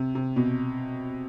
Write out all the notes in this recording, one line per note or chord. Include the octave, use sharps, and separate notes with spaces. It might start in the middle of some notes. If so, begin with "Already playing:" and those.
Already playing: C3
C3
B2